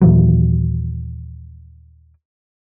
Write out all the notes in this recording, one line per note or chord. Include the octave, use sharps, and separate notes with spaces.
D#2 A#2 E3 F#3